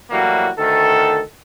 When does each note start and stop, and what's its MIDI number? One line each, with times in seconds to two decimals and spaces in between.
0.11 0.48 45
0.11 0.48 52
0.11 0.48 54
0.11 0.48 55
0.11 0.48 58
0.11 0.48 66
0.58 1.21 38
0.58 1.21 51
0.58 1.21 69